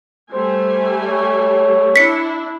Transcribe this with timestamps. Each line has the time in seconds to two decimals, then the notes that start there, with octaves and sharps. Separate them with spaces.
0.32 G3 A3 C5 G#5
1.06 C#5
1.96 D4 E4 B6 C#7